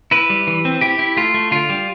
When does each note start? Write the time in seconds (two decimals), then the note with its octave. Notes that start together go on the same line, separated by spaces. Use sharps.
0.11 E4 B4
0.30 G3
0.47 E3
0.65 C4
0.81 E4 G4
0.99 E4
1.17 A3 F4
1.34 A3
1.51 D3 F4
1.70 G3